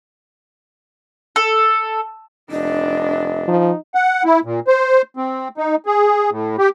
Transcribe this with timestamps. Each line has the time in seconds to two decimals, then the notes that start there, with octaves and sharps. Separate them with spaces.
1.36 A4
2.51 F1 D4 D#5
3.48 F3 D#4
3.95 F#5
4.25 E4
4.45 A#2
4.67 C5
5.17 C4
5.57 D#4
5.86 G#4
6.31 A2
6.59 G4